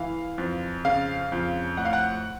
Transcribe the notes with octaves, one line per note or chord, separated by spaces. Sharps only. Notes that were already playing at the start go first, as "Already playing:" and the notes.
Already playing: E3 F5
F2
C#3 F5
F2
A2 F#5
F5
F#5